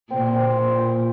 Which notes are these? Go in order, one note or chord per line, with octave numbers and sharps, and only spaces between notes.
A#2 C4
C4
A#2 F4
C5